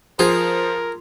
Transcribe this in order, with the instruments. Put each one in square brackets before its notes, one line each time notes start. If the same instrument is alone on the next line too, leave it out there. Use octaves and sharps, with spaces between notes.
[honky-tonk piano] F3 [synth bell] F4 C6 [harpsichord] G#4 [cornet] A#4